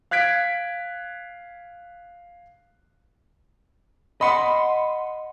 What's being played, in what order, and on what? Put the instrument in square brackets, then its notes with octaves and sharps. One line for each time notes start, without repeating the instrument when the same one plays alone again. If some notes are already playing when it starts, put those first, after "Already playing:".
[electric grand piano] F5 F#6 G#6 B6 D7
[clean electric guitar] D#5 F#5 [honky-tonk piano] B5 C6